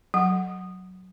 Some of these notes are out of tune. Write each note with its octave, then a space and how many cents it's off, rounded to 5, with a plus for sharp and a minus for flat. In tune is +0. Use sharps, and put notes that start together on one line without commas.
F#3 +0 F#5 +0